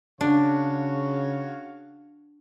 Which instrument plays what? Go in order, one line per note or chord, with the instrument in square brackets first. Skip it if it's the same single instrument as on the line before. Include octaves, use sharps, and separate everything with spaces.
[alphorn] C#3 [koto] D4 [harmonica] F#4 C#5 F5